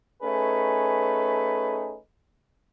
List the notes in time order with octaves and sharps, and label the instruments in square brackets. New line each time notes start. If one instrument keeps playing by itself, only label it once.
[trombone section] A3 C#4 D#4 G#4 B4